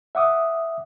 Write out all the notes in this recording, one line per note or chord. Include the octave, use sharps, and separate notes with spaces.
E5 F#5 D6 D#6